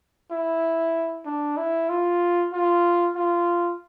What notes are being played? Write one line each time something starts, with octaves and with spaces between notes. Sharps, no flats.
E4
D4
E4
F4
F4
F4